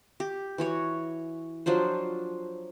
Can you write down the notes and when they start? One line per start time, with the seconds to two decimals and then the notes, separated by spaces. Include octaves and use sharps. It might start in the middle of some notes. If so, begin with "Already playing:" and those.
0.20 G4
0.58 E3 F#4 C#5
1.66 F3 F#3 D4 C5